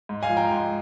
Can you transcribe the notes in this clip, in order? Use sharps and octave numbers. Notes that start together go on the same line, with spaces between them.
G#2
F5 G#5
F3
G5 A#5
G#2